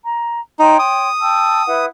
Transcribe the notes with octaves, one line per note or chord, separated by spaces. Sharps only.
A#5
D#4 C#5 G5 C6
D#6
G5 A5 E6
E4 B4 F#5